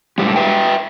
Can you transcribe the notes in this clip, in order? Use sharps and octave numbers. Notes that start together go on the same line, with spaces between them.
A2 G3 G#3
B4 E5 G5